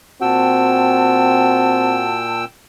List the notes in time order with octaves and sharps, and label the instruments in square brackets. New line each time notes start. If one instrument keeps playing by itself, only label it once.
[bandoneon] A#2 G5 E6 [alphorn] C4 [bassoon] F#4 [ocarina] A5